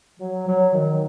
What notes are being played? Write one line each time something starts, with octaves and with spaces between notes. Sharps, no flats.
F#3
F#3
D#3